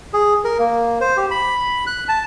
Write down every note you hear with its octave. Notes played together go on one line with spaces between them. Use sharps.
G#4
A#4
A#3
C5
G4
B5
F#6
A5